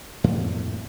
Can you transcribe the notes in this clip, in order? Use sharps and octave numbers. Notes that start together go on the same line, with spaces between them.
F2 A2 F3 A#3